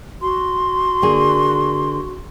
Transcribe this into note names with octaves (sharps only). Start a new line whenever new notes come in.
F#4 C6
D3 A#3 G#4